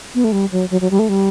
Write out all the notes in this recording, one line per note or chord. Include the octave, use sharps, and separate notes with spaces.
B3
A3
G3
F#3
F#3
F#3
G3
A3
G3